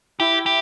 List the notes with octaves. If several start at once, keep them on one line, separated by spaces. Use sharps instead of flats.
E4 G4
G4